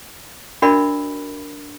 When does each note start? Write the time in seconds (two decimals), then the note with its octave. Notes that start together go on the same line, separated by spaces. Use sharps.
0.62 D4 F#4 A#4 D5 E5 B5